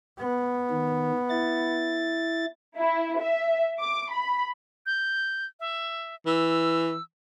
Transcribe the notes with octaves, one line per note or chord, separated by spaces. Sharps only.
B3
D#3
E4 A6
E4
E5
D6
B5
G6
E5
E3 E6